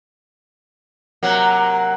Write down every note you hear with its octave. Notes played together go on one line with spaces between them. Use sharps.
C3 F#3 A#3 F#5